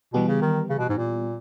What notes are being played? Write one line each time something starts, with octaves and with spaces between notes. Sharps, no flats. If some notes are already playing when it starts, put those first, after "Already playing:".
B2 E3 G3 B3 G4
C#3
D#3
C#3
B2
G#2
A#2